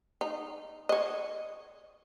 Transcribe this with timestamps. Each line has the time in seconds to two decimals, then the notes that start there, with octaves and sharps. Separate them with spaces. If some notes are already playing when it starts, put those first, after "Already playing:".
0.21 D#4
0.89 C#5 D#5